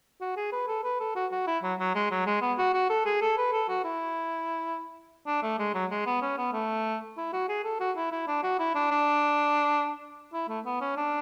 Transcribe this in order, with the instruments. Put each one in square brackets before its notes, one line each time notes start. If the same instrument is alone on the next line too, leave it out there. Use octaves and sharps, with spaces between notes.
[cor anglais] F#4
G#4
B4
A4
B4
A4
F#4
F#4
E4
F#3
F#3
G#3
F#3
G#3
B3
F#4
F#4
A4
G#4
A4
B4
A4
F#4
E4
D4
A3
G#3
F#3
G#3
B3
C#4
B3
A3
E4
F#4
G#4
A4
F#4
E4
E4
D4
F#4
E4
D4
D4
E4
A3
B3
C#4
D4